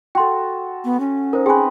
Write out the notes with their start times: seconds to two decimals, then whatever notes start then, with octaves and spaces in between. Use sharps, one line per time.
0.15 F#4 A4 G5 C6
0.85 B3
1.00 C#4
1.33 D#4 A#4 C5
1.46 C4 G#4 B4 G#5